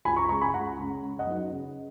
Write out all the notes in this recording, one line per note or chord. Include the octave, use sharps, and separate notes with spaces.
C#2 G#5 B5
A#5 C#6
C#3 G#3 C#4 A#5 C#6
G#5 B5
C#2 F#5 A#5
C#3 G#3 C#4
C#3
D#5 F#5
F#3 B3 D#4
C#3